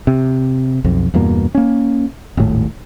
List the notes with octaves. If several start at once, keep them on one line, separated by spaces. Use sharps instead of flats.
C3
B1 F2
E2 G2 B2 A#3
A#3 C#4
D#1 G#1 A2